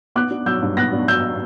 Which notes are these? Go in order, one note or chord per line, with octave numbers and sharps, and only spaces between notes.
B3 D6 F#6
D4
F#3 E6 G6
G2
B3 F#6 A#6
D4
F#3 E6 G6